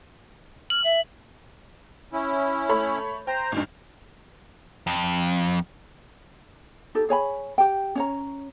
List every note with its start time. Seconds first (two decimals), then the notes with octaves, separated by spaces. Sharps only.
0.70 F6 F#7
0.84 E5
2.13 C#4 E4
2.69 A3 C#5 B5
3.27 C5 G5 A#5
3.52 G#1 G2 G#3
4.87 F2
6.95 D#4 G4 A4
7.09 G#4 C#5 G#5 B5
7.58 G4 G5
7.95 C#4 C#5 A#5